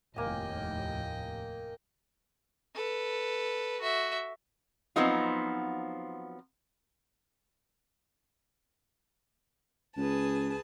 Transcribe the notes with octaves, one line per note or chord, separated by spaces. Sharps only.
F1 D#2 A2 A#3 D#5 G5 G#5
A4 B4
F#4 E5
F3 F#3 B3 C4 D#4 F4
C#2 G#4 B4 A5